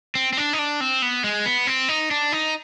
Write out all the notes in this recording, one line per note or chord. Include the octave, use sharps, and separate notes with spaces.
C4
C4
D4
D#4
D4
C4
B3
G#3
B3
C4
D#4
D4
D#4